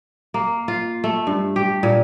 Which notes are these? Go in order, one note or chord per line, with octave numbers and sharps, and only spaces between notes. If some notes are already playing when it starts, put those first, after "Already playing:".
A#3
F4
A3
G2
G4
A#2